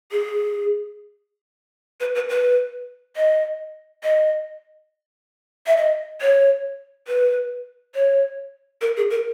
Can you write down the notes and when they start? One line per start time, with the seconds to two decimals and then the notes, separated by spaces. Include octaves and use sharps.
0.11 G#4
2.00 B4
2.15 B4
2.29 B4
3.16 D#5
4.03 D#5
5.67 E5
5.77 D#5
6.21 C#5
7.08 B4
7.95 C#5
8.81 A#4
8.97 G#4
9.10 A#4